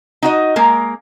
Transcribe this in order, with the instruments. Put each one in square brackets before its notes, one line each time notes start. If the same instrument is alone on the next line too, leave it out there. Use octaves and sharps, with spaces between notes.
[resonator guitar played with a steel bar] D#4 F#4 D#5
G#3 A#3 A#4